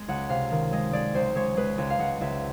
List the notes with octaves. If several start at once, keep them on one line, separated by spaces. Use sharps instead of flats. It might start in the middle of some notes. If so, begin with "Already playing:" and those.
Already playing: G#3
C#2 F#5
C3 F5
D#3
G#3 D#5
G#3 D5
C#2 C5
G#3 C#5
G#3 B4
C#2
F5
C#2 F#5
C#2 E5